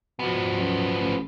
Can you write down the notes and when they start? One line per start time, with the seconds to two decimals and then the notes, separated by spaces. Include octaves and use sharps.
0.19 B2 F3 B3
0.60 F#2
0.99 A1